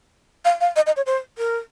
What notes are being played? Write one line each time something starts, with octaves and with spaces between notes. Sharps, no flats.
F5
F5
D#5
D#5
C#5
C5
A#4